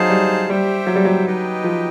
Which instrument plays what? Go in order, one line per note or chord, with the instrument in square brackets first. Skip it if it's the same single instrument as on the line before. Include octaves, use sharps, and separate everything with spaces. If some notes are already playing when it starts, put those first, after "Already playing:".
Already playing: [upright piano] F#3 [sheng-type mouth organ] D#4 G#4 C5 F5 A5
[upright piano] G3
[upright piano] G3 [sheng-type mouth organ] G4 C5 E5 G5
[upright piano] F#3
G3
F#3
[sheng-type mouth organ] D#4 G4 B4 D#5 G5
[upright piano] F3